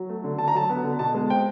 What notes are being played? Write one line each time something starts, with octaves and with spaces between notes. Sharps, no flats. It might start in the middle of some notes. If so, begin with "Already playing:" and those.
Already playing: F#3
A3
D3
D3 A5
A#5
F#3 A5
B3
D3
B2 A5
G#3
C4 G5